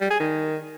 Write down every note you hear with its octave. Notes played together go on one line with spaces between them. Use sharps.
G3
G#4
D#3